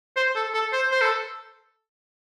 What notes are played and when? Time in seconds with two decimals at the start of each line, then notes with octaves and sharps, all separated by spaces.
0.16 C5
0.35 A4
0.54 A4
0.73 C5
0.92 C5
1.01 A4